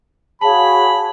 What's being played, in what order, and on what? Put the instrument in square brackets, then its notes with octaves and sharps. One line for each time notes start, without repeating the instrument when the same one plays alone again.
[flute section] F#4 G#4 C#5 [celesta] F5 A5 [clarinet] B5